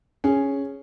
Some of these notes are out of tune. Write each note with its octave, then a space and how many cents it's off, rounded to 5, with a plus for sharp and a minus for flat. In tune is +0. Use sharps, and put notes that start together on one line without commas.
C#4 +0 G#4 +0